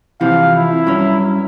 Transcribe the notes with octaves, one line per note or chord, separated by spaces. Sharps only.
C3 E3 F3 F5
E4
G2 F#3 C#4